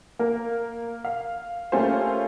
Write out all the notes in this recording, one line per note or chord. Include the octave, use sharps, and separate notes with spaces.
A#3 A#4
F5
G3 A3 A#3 C#4 F4 C5